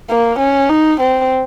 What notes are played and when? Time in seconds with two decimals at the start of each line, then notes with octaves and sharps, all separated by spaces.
0.10 A#3
0.39 C#4
0.69 D#4
1.01 C4